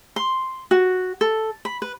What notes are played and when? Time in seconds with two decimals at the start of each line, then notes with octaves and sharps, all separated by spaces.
0.16 C6
0.71 F#4
1.21 A4
1.65 B5
1.82 B4